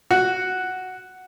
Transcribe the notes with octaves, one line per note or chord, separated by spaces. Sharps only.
F#4